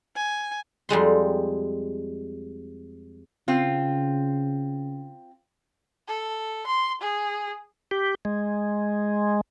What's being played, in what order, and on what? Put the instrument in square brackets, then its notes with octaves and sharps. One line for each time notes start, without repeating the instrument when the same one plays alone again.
[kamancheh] G#5
[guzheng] F2 G3 G#3 C6
[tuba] C#3 [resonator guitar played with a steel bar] C4 F4
[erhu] A4
C6
G#4
[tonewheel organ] G4
G#3